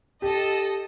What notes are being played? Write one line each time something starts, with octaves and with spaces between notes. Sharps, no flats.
G4 A4 D#5